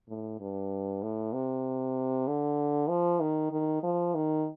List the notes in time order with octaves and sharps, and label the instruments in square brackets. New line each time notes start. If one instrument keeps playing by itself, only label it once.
[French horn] A2
G2
A2
C3
D3
F3
D#3
D#3
F3
D#3